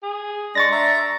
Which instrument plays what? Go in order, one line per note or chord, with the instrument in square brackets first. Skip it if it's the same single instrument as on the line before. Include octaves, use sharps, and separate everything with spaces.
[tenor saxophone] G#4
[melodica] G#3 [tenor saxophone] D4 [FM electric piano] C#6 A6 A#6
[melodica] E5 A#5